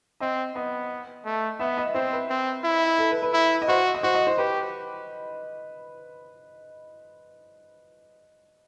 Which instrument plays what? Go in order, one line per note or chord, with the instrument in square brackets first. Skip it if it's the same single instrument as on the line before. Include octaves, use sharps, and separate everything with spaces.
[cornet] C4 [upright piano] D#5
[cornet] B3 [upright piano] D#5
[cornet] A3
[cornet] B3 [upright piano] E5
[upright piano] D#5
[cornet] C4 [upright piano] C5
[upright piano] B4
[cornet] C4
E4
[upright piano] A4
B4
B4
[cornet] E4
[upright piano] D#5
[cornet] F#4 [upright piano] C5
[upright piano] D#5
[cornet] F#4 [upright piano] C5
[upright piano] D#5
C5
[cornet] G4 [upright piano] B4